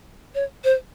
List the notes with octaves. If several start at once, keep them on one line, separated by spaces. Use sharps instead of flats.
C#5
C5